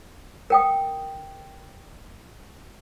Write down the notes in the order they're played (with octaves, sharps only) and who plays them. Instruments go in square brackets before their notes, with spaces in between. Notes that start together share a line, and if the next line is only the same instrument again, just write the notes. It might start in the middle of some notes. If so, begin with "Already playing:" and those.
[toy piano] A#4 G5 D#6